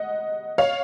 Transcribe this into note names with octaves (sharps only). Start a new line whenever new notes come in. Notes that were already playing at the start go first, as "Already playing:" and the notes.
Already playing: D#5 F#5
C#5 F5